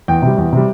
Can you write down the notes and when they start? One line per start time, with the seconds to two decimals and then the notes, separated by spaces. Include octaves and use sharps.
0.08 E2 G5
0.22 C3 G3
0.38 E2
0.53 C3 G3